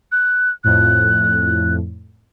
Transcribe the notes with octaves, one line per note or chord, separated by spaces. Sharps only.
F#6
F2 A2 F#6